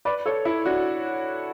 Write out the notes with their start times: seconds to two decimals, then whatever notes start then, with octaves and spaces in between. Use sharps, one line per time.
0.05 B4 D5
0.26 A4 C#5
0.45 E4
0.65 D4 F#4